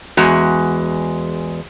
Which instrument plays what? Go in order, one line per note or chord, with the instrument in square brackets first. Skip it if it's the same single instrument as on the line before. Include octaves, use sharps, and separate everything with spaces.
[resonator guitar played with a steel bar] E2 G#3 F#4